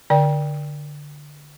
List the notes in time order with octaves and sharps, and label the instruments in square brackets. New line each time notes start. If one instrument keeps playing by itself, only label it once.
[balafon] D3 D5 G5